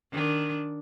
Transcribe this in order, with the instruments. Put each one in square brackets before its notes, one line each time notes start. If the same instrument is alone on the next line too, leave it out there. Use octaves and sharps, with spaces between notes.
[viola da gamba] D#3 D4